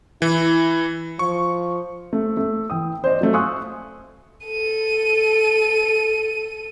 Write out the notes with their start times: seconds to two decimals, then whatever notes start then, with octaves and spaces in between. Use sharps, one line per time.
0.22 E3 E4
1.19 F3 C#6
2.13 A3
2.37 A3
2.70 E3 G5 D#6
3.04 C5 D5 D#5
3.21 F#3 A3
3.33 F5 G#5 C6 C#6 D#6 F#6
4.46 A4 D#7